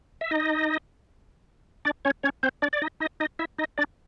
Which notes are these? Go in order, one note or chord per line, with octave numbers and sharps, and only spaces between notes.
E5
D#4 D#5
D4 D5
C#4 C#5
C#4 C#5
C4 C5
D4 D5
D5
D#4 D#5
D#4 D#5
D#4 D#5
E4 E5
D#4 D#5
D4 D5